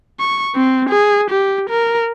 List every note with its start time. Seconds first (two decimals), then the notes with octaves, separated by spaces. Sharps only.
0.20 C#6
0.55 C4
0.89 G#4
1.30 G4
1.69 A#4